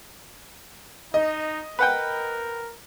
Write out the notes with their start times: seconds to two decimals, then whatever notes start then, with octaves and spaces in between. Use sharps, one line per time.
1.14 D#4 D#5
1.79 A#4 B4 F#5 G5